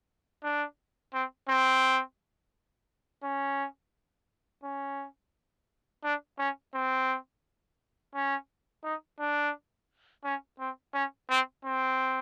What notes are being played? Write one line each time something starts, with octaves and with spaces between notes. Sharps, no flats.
D4
C4
C4
C#4
C#4
D4
C#4
C4
C#4
D#4
D4
C#4
C4
C#4
C4
C4